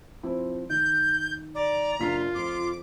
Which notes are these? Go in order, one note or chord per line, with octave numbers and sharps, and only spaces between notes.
F3 C4 E4
D#3 G6
D5 A#5
F#1 D4 F4 B6
F2 D6